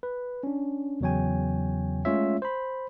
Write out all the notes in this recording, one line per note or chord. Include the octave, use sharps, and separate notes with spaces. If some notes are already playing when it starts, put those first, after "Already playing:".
B4
C#4 D4
E2 C#3 F#3 C#5 G5 G#5
G#3 A3 C#4 F4 C#5 E5
C5 B5